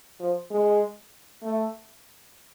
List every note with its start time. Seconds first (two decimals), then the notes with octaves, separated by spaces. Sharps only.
0.20 F3
0.51 G#3
1.43 A3